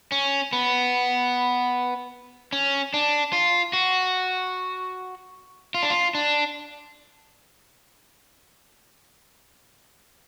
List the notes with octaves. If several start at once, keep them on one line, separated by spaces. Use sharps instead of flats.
C#4
B3
C#4
D4
F4
F#4
F4
D4
F4
D4